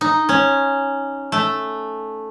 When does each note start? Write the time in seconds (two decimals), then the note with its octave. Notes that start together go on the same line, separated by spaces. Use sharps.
0.01 D#4
0.29 C#4
1.32 A3